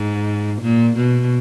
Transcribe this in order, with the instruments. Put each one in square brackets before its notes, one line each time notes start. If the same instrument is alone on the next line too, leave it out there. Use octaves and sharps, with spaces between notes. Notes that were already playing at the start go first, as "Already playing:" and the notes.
Already playing: [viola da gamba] G#2
A#2
B2